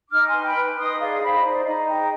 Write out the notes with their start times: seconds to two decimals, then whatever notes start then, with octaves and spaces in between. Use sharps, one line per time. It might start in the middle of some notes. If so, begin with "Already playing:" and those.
0.09 D#4 D6 F6
0.27 G#5 C6
0.32 B4
0.43 G5 B5
0.54 B4
0.77 D#4 C6 D#6
0.99 G#4 D5 F5
1.21 C5 G5 B5
1.36 D#5
1.43 D#4 D5
1.65 D#4 D#5
1.87 G#4 D#5 G5